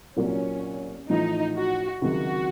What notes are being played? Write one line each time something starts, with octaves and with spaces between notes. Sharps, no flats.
C2 A#2 F#3 A#3 C#4 F4
A1 A2 F3 D#4
F#4
C#2 C3 D#3 F#3 F#4